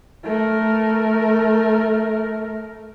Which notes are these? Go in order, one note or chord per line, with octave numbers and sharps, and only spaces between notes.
A3 A#4